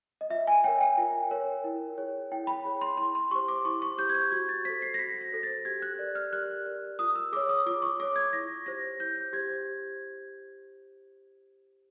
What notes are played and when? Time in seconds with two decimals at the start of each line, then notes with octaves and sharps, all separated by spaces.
0.21 D#5
0.30 F4 E5
0.47 G#5
0.64 A#4 C#5 G5
0.81 G5
0.98 F4
1.31 A#4 C#5
1.64 E4
1.98 G#4 C#5
2.32 E4 G5
2.47 B5
2.65 G#4 C#5
2.81 C6
2.97 E4 C6
3.15 C6
3.31 G4 C5 C#6
3.48 D6
3.65 E4 C#6
3.82 C#6
3.98 G4 C5 G6
4.10 G#6
4.15 G6
4.32 F#4 G#6
4.49 A6
4.65 A4 C5 B6
4.82 C7
4.94 A#6
4.98 F#4 B6
5.21 A#6
5.32 A4 C5
5.43 A6
5.65 G4 G#6
5.82 F#6
5.99 A#4 D5
6.15 F6
6.33 G4 F#6
6.66 A#4 D5
6.99 F4 D#6
7.15 E6
7.32 G#4 C#5 D6
7.49 D#6
7.66 F4 D6
7.82 C#6
7.99 G#4 C#5 D6
8.16 G#6
8.33 E4 A#6
8.66 G4 C5 A#6
8.99 E4 G6
9.33 G4 C5 G#6